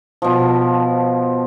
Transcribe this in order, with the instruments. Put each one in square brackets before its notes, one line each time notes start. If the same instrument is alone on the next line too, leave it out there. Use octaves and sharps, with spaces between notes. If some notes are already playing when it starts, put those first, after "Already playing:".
[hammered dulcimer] B2 F3